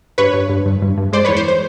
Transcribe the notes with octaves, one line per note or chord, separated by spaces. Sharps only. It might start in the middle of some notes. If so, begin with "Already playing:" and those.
G2 B4 C#5
G2
G2
G2
G2
G2
G#3 C5 D5
B4 C#5
E2
C5
C5